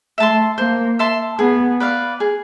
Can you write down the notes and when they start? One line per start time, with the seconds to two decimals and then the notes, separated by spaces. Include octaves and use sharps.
0.18 A3 E5 A5 C6
0.58 A#3 C5
0.99 E5 A5 C6
1.39 B3 G#4
1.80 B4 D5 F5
2.20 G#4